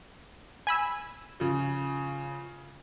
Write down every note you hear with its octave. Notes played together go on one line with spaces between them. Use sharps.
G#5 B5 E6
C#3 F3